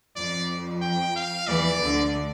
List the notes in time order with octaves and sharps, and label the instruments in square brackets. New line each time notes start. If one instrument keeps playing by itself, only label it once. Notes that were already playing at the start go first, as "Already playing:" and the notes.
[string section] F2 F3 [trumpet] D5
[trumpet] G5
F5
[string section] E2 E3 [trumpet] D5
[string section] D2 D3